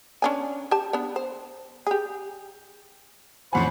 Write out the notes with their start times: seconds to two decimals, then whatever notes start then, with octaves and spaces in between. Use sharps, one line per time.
0.22 C#4 D4 G#5
0.71 G4 A5
0.93 B3 D4
1.16 C5
1.87 G4 G#4
3.53 A1 F2 C5 F#5 G#5 B5